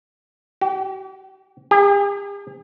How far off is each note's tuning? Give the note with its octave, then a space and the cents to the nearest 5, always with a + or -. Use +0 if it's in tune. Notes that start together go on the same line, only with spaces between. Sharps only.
G4 -45
G4 +45